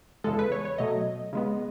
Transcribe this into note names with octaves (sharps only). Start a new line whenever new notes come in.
E2 C#3 G#3 A4
B4
C#5
C#5
B2 F#3 A3 D#5
C#3 G#3 B3